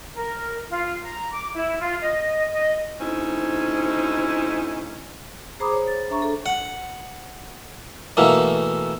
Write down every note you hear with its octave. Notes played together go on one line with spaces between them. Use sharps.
A#4
F4
A#5
D6
E4
F4
D#5
D#5
D2 C4 C#4 D#4 E4
G#4 C5 A#5 B5 D6 D#6
C#5
A6
D4 E5 A#5 C#6
A4
F#5
B2 E3 A3 A#3